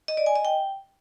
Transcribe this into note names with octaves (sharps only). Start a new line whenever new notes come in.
D#5
D5
G#5
D#5
G5